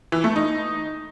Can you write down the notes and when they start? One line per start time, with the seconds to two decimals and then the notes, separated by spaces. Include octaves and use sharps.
0.12 E3
0.24 A3
0.36 D#4